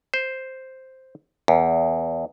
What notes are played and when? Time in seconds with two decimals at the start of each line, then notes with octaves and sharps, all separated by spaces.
0.14 C5
1.48 E2